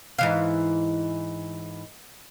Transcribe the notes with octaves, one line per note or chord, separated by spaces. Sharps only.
G#2 E3 F5